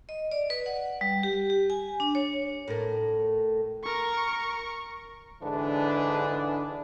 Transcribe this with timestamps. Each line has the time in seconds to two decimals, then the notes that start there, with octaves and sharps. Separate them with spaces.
0.09 D#5
0.31 D5
0.50 B4
0.66 F#5
1.01 G3
1.23 G4
1.50 G4
1.70 G#5
2.00 D4
2.15 C#5
2.68 A2 A#4
3.84 A#4 C#6
5.42 G#2 D3 E3 D4 G#4 B4